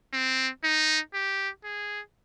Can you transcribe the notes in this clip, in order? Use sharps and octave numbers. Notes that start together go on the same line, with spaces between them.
C4
D#4
G4
G#4